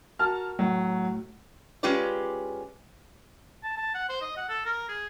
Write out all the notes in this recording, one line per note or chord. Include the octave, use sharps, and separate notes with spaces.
F#4 A#4 A5 F6
A2 F#3
G#3 C#4 F4 G4 B4 D5
A5
A5
F#5
C5
D#5
F#5
A4
A#4
G#4